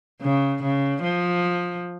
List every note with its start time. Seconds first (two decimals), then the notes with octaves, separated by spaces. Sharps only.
0.22 C#3
0.63 C#3
1.04 F3